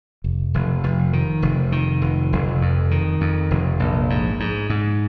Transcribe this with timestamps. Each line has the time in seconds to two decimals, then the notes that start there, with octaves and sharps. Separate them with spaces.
0.24 F1
0.54 F1
0.84 F1
1.13 D#3
1.42 F1
1.72 D#3
2.02 F1
2.32 F1
2.61 F2
2.91 D#3
3.21 F2
3.51 F1
3.80 A#1
4.10 G#2
4.40 G#2
4.70 G#2